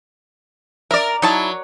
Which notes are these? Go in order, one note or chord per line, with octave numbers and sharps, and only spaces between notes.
A#4 D5 E5
F#3 D#4 E4 A5